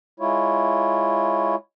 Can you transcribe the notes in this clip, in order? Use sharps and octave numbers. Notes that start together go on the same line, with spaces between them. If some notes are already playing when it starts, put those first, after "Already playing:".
G#3 E4 F4 C#5